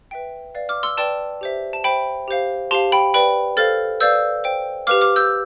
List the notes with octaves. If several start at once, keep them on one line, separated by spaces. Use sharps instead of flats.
B4 E5 G5
B4 D5 F5
D6 F6
C6 E6
B4 D5 G5 A5 C6
G4 C5 E5
A5
C5 E5 G5 B5
G4 C5 F5
G4 C5 F5 A5 C6
G5 B5
B4 D5 G5 B5
A4 C5 F5 F6 A6
B4 D5 F5 E6 G6
C5 G5
G4 B4 F5 D6 F6
D6 F6
E6 G6